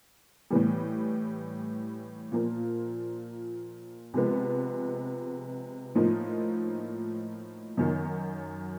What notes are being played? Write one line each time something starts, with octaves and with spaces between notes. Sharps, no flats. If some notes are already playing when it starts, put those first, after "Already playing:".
A2 E3 G3
A#2 F3 A#3
C3 F3 G#3 B3
A2 F3 A#3 D#4
F#2 D#3 F#3